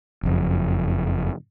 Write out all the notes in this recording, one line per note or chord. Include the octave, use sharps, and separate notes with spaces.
F#1 F2